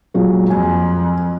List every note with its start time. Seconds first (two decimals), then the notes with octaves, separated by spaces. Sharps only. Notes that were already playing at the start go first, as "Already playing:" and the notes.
0.14 A#2 F#3 G#3
0.50 F2 G#5